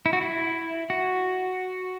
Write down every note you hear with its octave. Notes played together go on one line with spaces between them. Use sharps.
E4
F#4
E4
F#4